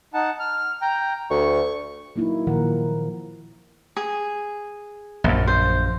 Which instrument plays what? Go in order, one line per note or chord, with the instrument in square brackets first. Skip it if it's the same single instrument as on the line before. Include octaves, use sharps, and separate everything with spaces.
[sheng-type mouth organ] D#4 F#5 A5
F6
G5 A#5
[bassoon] D2 [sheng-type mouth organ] C#6
[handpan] F#3 A#3 D#4 E4
A#2 D#3 F3 A#4 F#5
[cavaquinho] G#4
[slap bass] A#1 F#2
[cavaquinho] C5